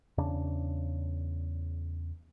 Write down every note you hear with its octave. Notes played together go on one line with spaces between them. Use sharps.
E2 C#3 D4